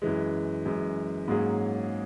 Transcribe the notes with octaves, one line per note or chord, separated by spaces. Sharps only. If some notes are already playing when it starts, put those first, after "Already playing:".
F#2 E3 G#3
F#2 E3 G#3
G#2 F#3 A#3 C#4 G#4